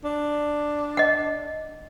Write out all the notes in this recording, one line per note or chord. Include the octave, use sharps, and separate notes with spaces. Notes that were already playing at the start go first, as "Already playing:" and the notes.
D4
D#5 F#5